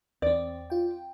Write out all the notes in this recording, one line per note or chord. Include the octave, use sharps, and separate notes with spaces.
E2 C4 D5
F4 G5